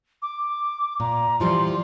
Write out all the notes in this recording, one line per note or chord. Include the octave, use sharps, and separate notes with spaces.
D6
A#2 A#5
E3 F3 G3 C6